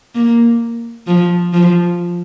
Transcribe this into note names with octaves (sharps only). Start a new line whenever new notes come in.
A#3
F3
F3